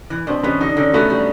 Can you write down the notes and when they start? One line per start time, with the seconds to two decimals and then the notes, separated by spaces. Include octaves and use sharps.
0.10 E3
0.27 B2 C4 D4
0.43 B2 B3 C#4
0.60 D3 D#4
0.69 D4
0.77 D3 C#4 D#4
0.93 A3 B3 F#4
1.10 G3